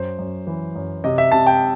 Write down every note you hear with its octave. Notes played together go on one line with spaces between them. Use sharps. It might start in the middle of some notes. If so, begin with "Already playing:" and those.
Already playing: F#2 C5
F#2
E3
F#2
C3 D#5
E5
C3 A5
G5